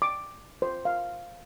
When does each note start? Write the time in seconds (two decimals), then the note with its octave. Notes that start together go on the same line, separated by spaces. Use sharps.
0.02 D6
0.62 C5
0.85 F5